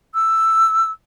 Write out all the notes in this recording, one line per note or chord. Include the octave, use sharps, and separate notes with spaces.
E6